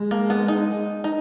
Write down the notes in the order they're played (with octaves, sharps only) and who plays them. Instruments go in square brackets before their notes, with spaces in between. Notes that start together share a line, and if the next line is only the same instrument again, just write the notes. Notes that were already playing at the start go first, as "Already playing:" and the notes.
Already playing: [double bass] G#3
[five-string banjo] A#3
B3
D#4
D#4